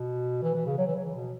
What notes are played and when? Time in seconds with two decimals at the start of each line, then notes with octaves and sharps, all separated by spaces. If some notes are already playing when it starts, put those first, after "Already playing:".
Already playing: B2
0.42 E3
0.54 E3
0.66 C#3
0.78 F#3
0.87 E3
0.95 F#3
1.05 E3
1.15 B2